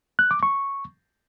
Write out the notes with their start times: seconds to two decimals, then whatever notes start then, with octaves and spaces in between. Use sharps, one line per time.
0.19 F#6
0.31 D6
0.43 C#6